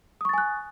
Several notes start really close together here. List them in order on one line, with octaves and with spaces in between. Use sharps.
D#6 C#6 A6 G#5 F#6